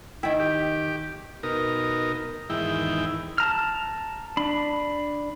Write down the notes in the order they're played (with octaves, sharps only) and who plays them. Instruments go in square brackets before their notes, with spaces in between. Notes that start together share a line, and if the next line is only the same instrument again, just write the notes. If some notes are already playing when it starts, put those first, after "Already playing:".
[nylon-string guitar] D#3 G5 [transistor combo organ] E4
[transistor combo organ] G4
B2 D#4 A#4
E2 G#2 D#3 E4 G5
[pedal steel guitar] A5 A#5 F6
D4 B5